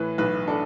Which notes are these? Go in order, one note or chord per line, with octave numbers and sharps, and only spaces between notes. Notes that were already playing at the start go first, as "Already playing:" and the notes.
Already playing: A2 E3 B4
B1 B4
D4 A4